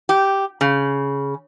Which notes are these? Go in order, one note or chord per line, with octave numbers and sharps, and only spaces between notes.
G4
C#3